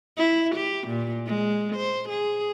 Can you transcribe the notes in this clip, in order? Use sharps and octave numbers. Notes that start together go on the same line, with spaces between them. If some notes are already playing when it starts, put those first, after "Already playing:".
E4
G4
A#2
G#3
C5
G#4